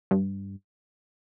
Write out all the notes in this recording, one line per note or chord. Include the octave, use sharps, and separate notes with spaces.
G2